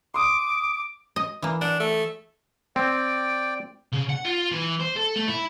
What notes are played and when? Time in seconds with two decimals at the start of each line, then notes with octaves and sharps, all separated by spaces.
0.14 C6 D6 D#6
1.16 D#5
1.42 E3 A#3
1.61 D4 F#5
1.80 A3
2.76 C4 D5 G5
3.93 C#3
4.09 F#5
4.25 F4
4.52 E3
4.80 C5
4.96 A4
5.16 A3
5.28 E4